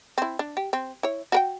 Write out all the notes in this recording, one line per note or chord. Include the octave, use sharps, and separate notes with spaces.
C4 E4
D4
G4
C4
E4 C#5
F#4 A#4 G5